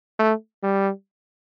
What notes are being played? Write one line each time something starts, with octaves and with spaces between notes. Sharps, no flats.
A3
G3